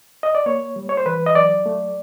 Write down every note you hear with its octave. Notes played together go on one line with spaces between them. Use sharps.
D#5
D5
A#3 C#5
G3
C#5
C5
E3 B4
D#5
F#3 D5
A3